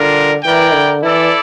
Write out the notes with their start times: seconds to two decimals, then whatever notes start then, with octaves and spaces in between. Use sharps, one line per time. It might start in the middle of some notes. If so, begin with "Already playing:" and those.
Already playing: D3 G3 D4 F4 A#4
0.44 E3 E4 A#4 D5 G5
0.74 D3
1.03 E3 E4 A4 D5